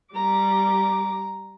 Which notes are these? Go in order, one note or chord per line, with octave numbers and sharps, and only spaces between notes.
G3 A#5 D6